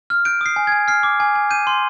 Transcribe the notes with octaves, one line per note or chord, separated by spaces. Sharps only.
F6
G6 D7
D#6 C7
G#5
G#6
G#5
F6 C7
D6
G#5
G#5
G6 D#7
C6